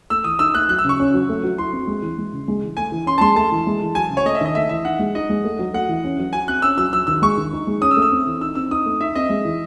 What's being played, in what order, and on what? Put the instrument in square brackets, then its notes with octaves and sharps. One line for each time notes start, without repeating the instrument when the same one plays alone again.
[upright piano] A3 [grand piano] E6
[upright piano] E3 [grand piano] D#6
[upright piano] D#4 [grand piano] E6
[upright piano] A3 [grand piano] F#6
[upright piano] F#3 [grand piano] F#6
[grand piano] E6
[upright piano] C#3 [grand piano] C#6
[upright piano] C#4
F#3
A3
F#3
[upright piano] E4 [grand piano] C6
[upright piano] C4
G#3
E3
G#3
C#3
G#3
E3
[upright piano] A3 [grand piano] G#5
[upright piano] E3
[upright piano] C#4 [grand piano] C6
[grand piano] A5
[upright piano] G#3 [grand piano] C6
[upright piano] A3 [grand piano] A5
[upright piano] E3
G#3
E3
[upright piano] F#3 [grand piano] G#5
[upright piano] C#3
[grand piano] C#5
[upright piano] A3 [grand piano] D#5
[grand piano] E5
[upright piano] D#3 [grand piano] D#5
[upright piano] A3 [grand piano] E5
[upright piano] E3 [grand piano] E5
[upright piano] D#4 [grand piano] F#5
[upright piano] G#3
[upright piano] D#4 [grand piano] D#5
[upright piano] G#3
A3
F#3
[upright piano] A3 [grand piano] F#5
[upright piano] E3
C#4
F#3
[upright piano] F#4 [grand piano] G#5
[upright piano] C4 [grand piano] F#6
[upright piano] C#4 [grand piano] E6
[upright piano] F#3 [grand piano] E6
[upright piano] F#3 [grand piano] E6
[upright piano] D#3 [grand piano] E6
[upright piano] G#3 [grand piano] C#6
[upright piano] D#3
D#4
G#3
[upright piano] C#4 [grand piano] D#6
[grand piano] E6
[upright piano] A3
[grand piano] E6
[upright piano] C4
E3
[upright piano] D#4 [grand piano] E6
[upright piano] C4 [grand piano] E6
[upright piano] D#4 [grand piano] D#6
[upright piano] A3
[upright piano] D#4 [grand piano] E5
[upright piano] C4 [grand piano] D#5
[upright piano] G#3
E3